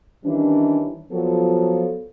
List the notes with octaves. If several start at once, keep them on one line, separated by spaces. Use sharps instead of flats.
D#3 E3 G3 C#4 D4
F3 F#3 B3 F4 A4